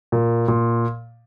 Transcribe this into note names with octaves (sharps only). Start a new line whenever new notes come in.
A#2
A#2